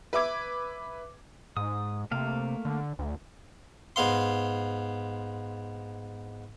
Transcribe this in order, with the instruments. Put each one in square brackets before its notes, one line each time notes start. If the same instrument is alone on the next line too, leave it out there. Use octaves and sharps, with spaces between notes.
[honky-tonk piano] B4 E5 D6 G#6
[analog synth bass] G#2 [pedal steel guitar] D#6
[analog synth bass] C3 [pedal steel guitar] A3 A#3 F5
[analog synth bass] D3
D2
[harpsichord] G#2 B3 F5 C6